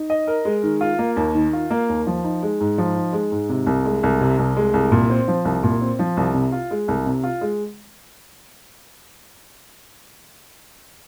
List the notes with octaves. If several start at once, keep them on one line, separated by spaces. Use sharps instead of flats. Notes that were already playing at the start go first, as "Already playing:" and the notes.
Already playing: D#4
D#5
A#4
G#3
D#3
F4
A#3
D#2
D#3
F4
A#3
D#2
F3
D#4
G#3
G#2
F3
D#4
G#3
G#2
C3
C2
G#3
C2
C3
C2
G#3
C2
A#2
C4
F3
C2
A#2
C4
F3
C2
C3
F4
G#3
C2
C3
F4
G#3